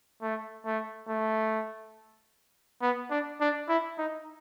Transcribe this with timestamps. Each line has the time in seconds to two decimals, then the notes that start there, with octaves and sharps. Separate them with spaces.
0.22 A3
0.66 A3
1.09 A3
2.82 B3
3.11 D4
3.41 D4
3.69 E4
3.98 D#4